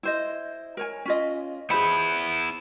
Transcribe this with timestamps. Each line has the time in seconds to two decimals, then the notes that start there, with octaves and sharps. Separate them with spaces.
0.03 E4 C5 D#5
0.77 A#4 C#5 G#5
1.05 C#4 F4 D#5
1.70 B3 E4 G#4 C5 B5